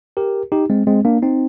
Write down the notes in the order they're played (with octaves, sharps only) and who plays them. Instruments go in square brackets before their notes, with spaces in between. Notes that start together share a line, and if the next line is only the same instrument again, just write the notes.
[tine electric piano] G4 A#4
D#4 G4
G#3 C4
G#3 C4
A#3 D4
C4 D#4